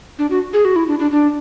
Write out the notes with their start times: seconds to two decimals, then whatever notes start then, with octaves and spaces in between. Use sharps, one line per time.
0.19 D4
0.31 F#4
0.53 G#4
0.65 F#4
0.76 E4
0.88 D4
0.99 D4
1.11 D4